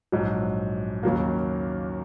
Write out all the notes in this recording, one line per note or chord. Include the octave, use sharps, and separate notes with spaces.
A#1 G#2 F#3
D#2 C#3 F#3 A#3